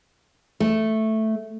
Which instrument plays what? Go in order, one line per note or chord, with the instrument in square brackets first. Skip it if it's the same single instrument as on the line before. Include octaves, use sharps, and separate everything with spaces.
[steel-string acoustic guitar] A3